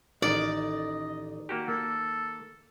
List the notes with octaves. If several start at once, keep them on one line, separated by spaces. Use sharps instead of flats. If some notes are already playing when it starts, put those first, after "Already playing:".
A1 D#3 D5 D#5
A#3 F#4 G4
A#3 A4